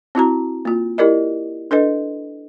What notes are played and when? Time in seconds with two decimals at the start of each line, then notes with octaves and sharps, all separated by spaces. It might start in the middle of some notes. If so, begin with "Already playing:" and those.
0.15 C4 E4 F#4 A#5
0.65 A#3 F4
0.98 E4 G4 A#4 D5 D#5
1.71 D4 A4 B4 D#5